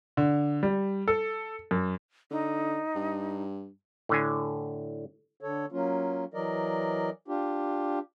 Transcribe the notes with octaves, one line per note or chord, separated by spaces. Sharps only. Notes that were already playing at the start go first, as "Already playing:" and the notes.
D3
G3
A4
F#2
D3 D#4
G2
A2 D3 G#5
D3 A4 C#5
F#3 A#3 C#4 F4
E3 F#3 A#4 D5 D#5
D4 F4 G4